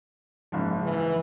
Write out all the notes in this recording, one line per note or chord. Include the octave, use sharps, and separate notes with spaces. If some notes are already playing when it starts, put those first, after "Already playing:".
F#1 G#2 F3
E3